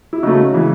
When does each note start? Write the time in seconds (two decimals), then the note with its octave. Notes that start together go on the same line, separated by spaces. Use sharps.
0.13 E4
0.23 C#3 F#3 A3 D#4 F#4
0.53 C#3 E3 G#3